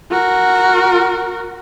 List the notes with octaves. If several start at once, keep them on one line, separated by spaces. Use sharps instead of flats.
F#4 A#4